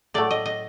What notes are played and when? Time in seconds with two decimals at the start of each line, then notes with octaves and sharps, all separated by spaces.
0.14 A2 F#3 A3 D5
0.31 D#5
0.46 D#5